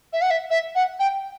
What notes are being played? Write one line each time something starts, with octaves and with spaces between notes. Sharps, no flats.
E5
F#5
E5
E5
F#5
G5